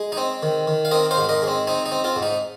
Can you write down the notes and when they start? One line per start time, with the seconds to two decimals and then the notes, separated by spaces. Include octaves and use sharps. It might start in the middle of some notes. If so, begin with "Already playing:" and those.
Already playing: G#3
0.12 D#4
0.17 C4
0.43 D#3
0.68 D#3
0.85 F5
0.91 C4 A#4 D#5
1.11 C5 F5
1.17 G#2
1.29 A#4 D#5
1.42 G#3
1.48 C4
1.67 C4 D#4
1.86 D#4
1.92 C4
2.04 C4 F4
2.16 G#2
2.22 D#4